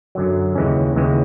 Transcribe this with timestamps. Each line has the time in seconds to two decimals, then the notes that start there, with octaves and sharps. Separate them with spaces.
0.15 F#2 D3 F#3
0.55 D#2 C#3 E3 G#3 C#4
0.96 D#2 C#3 E3 G#3 C#4